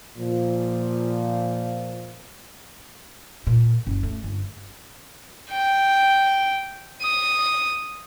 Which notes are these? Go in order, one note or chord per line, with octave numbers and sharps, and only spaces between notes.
A#2 F3
A#2
F#1
A3
G1
G5
D#6